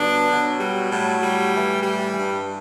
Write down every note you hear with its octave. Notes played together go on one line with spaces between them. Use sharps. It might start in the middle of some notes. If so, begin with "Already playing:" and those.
Already playing: G2 D3 F#3 B3 D4
B2 F#3
G3
A2 F#3
G3
A2 E3
G3
G2 E3